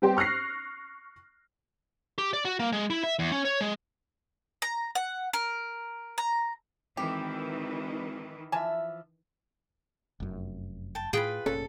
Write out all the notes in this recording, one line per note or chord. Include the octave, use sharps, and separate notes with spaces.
G3 B3 C4 G4 C5
C#6 F6 F#6 A#6 C7
G4
D5
F#4
A#3
G#3
E4
E5
E2
C#4
C#5
G#3
A#5
F#5
A#4
A#5
G#1 D#3 E3 G4
E3 F3 E5 G#5 A5
F1 F#2
G5 A5
A2 F4 G#4 B4 G5 B5
F1 A#2 C#4 A4